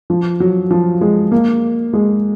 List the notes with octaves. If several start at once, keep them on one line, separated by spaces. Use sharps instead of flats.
F3
F#3
F3
G#3
A#3
G#3